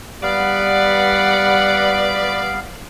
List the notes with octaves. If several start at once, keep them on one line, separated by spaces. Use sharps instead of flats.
G3 B3 B4 D5 F5 F#5